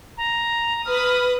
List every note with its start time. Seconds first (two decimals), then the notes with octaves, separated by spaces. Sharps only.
0.17 A#5
0.85 B4 D#6 F6